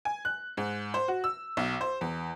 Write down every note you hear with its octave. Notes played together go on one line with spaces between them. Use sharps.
G#5
F#6
G#2
C5
F#4
E6
B1
C5
E2